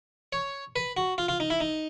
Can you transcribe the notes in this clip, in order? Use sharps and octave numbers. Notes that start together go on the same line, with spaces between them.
C#5
B4
F#4
F4
F4
D#4
E4
D#4